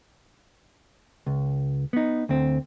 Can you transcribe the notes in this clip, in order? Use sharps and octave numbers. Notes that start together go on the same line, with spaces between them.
C#2
B3 D#4
D2 C4